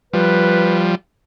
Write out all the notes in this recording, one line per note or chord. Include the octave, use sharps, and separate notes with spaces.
F3 G3 B4